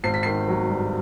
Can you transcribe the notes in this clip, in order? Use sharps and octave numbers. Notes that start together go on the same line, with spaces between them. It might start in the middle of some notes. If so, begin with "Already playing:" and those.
G#1 C7
B6
D#3 C7
F#3
G2